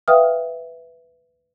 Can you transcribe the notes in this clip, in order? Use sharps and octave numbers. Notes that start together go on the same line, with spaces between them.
B4 E5 F5 G5 D#6 F6